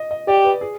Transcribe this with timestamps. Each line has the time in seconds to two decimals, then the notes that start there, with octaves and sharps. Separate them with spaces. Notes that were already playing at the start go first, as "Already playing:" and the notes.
Already playing: D#5
0.11 D#5
0.28 G4 D5
0.45 B4
0.61 G#4